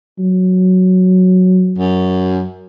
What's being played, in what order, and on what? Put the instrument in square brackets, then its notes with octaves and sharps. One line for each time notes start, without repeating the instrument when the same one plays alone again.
[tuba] F#3
[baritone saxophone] F#2